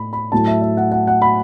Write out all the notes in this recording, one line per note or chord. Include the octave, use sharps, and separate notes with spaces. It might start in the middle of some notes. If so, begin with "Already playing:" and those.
Already playing: A2 A3 B5
B5
A2 F#3 A3 A5
E5
E5
F#5
F#5
F#5
B5